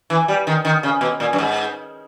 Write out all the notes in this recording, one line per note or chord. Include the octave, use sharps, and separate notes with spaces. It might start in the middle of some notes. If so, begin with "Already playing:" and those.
E3
G3
D#3
D#3
C#3
B2
A#2
G2
G#2